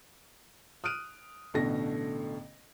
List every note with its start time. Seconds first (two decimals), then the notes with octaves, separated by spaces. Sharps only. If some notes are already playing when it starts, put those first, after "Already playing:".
0.84 D#6 F6 F#6 D7 D#7
1.54 A1 B2 D3 A3 A#6